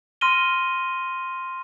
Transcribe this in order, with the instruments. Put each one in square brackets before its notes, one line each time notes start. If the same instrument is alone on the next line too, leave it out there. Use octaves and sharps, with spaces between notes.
[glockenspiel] C6 F6 A#6 D#7 G7